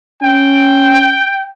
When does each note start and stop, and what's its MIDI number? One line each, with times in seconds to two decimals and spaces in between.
0.23 1.20 61
0.23 1.48 79